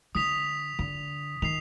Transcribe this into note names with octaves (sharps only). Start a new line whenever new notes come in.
D3 D#6 B6 F7
D3
D#3 C7 F7